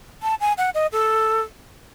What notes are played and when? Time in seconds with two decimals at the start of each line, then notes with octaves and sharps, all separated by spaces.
0.23 A5
0.41 G#5
0.58 F#5
0.74 D#5
0.92 A4